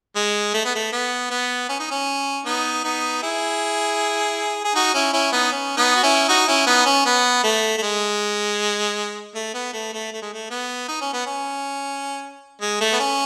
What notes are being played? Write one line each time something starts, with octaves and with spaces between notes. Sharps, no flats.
G#3
A3
B3
A3
B3
B3
C#4
D#4
C#4
B3 D#4
B3 D#4
E4 G#4
G#4
D#4 F#4
C#4 E4
C#4 E4
B3 D#4
C#4
B3 D#4
F#4
C#4 E4
D#4 F#4
C#4 E4
B3 D#4
C#4
B3
A3
A3
G#3
A3
B3
A3
A3
A3
G#3
A3
B3
D#4
C#4
B3
C#4
G#3
A3
B3
C#4